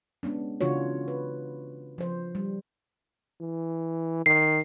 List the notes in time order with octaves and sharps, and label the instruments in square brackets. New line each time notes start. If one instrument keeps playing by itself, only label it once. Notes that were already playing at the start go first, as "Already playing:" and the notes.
[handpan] G#3 B3 C#4 D4
C#3 E3 D4 F4 F#4 C#5
B4
F3 C5
G3
[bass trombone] E3
[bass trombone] D#3 [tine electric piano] C7